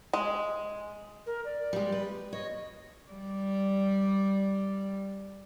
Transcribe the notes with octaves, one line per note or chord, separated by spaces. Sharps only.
G#3
A#4
D5
G3 G#3
B4
C#5 D#5
G3 D5